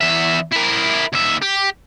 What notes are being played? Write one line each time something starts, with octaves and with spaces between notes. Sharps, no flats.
E2 E5
E4 A#4
D#2 E5
G4